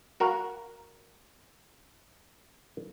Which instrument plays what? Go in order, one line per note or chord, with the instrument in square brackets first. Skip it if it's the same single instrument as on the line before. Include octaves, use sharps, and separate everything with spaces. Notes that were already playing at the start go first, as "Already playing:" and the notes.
[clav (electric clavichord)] F#4 A#4 F5 F#5